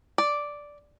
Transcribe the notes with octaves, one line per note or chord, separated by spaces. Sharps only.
D5